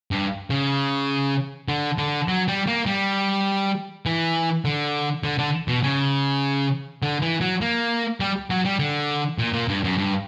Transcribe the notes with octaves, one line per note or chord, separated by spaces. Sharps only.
G2
C#3
D3
D3
F#3
G3
A#3
G3
E3
D3
D3
D3
B2
C#3
D3
E3
F#3
A#3
G3
F#3
G3
D3
A#2
A#2
G2
F#2
G2